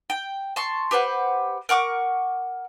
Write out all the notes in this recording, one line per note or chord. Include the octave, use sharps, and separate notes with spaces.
G5
A5 C6 C#6
G4 B4 C5 F#5
A#4 F#5 C#6 D6